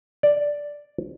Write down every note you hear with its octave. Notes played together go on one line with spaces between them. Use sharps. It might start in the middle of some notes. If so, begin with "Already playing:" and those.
D5